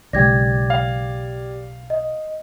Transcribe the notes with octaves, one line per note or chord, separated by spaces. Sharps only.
B1 C#3 G#3 G4 D5 G5 G#6 A#6
F5
D#5